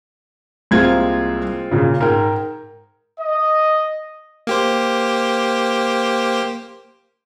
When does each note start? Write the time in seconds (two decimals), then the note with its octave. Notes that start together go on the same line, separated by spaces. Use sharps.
0.71 C2 G#3 A#3 C4 F4 G#6
1.71 A#2 C#3
2.00 G#2 A#4 G5
3.21 D#5
4.47 A#3 G4 C5